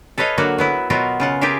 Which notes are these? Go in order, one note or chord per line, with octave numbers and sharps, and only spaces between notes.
A4 B4 C#5 D#5 F5
D3 F#3 A#3 F#4
F#3 B3 E4
B2 F#3 B3 F4 F#4 A#4
C#3 F4 F#5
F4 G4 G#4 A#4 E5 F5